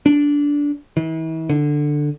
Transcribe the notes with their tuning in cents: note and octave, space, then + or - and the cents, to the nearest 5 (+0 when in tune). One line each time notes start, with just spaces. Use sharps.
D4 -15
E3 -40
D3 +10